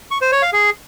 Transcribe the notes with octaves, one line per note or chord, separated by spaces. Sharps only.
C#6
C5
C#5
F5
G#4